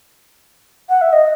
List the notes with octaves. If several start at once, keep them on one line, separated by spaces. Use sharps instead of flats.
F#5
E5
D#5